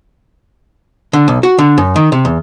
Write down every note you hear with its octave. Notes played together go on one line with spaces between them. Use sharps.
D3
B1
F#4
D3
F#2
D#3
C3
E2